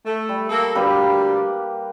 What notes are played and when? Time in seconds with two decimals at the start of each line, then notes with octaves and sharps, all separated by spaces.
0.06 A3
0.29 G3
0.49 A#3 A4
0.75 D2 G3 A#3 G4 B4